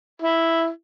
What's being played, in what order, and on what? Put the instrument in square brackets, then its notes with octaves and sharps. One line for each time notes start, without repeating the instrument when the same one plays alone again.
[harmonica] E4